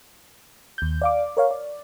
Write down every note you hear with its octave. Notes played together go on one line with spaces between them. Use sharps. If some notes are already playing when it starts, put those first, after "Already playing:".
D#2 G6
D5 F5 D6
A#4 C#5 F5
D5